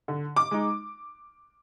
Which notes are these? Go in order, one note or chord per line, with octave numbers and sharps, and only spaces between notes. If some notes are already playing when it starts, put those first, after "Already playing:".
D3
D6
G#3 D#4